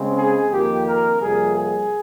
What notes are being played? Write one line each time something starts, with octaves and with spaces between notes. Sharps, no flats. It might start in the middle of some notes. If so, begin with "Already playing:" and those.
Already playing: C#3 G#3 C4
G#4
F2 D#3 A#3 G4
A#4
F2 C3 G3 A#3 G#4
G#4